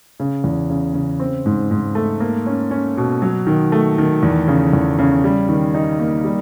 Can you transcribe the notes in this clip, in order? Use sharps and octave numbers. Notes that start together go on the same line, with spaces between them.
C#3
E2
C#3
C#3
C4
G#2
G#2
A3
A#3
C#4
C#4
B2
F#3
D#3
A3
D#3
E2
C#3
E2
C#3
G3
D#3
D#4
A#3
G3